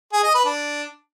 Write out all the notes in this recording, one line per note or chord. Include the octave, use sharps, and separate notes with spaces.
G#4
D#5
B4
D4